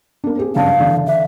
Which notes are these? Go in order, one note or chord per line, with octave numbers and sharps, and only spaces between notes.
A#3 D4
C4 G4 G#4
F#1 G2 F5 A5
D3 E3
E5